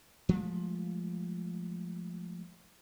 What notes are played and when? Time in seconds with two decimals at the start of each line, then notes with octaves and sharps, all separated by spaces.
0.29 F3 G#3 A3